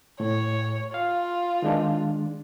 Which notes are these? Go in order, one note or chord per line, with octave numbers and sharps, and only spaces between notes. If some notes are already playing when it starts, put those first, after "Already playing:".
A2 C#5
F4 F5
D#3 G#3 D4